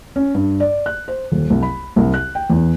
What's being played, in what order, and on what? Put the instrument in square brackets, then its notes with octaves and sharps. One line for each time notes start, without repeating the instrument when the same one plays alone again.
[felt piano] C#4
G2
D5
F#6
C5
D#1
C2
B5
C2
F#6
G5
E2